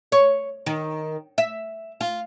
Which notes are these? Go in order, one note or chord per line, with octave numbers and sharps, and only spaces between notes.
C#5
D#3
E5
F4